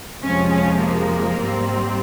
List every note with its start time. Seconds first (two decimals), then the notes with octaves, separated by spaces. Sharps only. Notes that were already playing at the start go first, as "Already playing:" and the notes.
0.23 F2 C3 F3 G#3 C#4
0.52 C#4
0.81 A#3
1.39 G#2 G3 C4